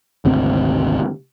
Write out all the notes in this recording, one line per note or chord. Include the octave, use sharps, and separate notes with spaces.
G#1 D2 C3 C4